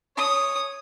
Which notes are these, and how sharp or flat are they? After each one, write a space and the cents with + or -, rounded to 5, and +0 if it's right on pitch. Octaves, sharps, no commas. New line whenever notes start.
C#5 +0 D#6 -5